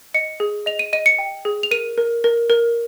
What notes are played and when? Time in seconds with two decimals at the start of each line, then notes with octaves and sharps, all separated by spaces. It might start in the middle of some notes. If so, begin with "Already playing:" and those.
0.14 D#5 C#7
0.40 G#4
0.66 D#5 F7
0.79 D#7
0.93 D#5 D#7
1.06 C#7
1.19 G5
1.45 G#4
1.63 F7
1.71 A#4 D#7
1.98 A#4
2.24 A#4
2.50 A#4